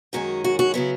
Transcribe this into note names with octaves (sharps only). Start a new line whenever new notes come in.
F#2 D#3 G#3 C#4 F#4
F#4
F#4
C#3 F#3 B3 E4